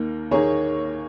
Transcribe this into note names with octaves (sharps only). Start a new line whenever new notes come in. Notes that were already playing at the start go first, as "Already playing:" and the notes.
Already playing: D#2 D#3 A#3
D#2 D#3 A#3 G#4 C#5